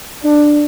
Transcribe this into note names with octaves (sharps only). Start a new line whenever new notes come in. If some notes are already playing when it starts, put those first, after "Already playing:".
D4